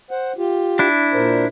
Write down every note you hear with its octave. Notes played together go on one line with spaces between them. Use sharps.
C5 F#5
F4 G4
D4 E4
A#2 A#4 C5